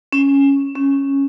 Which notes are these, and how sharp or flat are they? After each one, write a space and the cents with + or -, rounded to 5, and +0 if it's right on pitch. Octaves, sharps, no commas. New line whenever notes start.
C#4 +0
C#4 -5